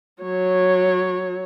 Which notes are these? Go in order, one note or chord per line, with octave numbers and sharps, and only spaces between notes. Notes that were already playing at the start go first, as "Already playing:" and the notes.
F#3 C#5